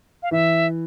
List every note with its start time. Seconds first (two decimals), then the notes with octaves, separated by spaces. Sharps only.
0.23 F5
0.31 E3 E5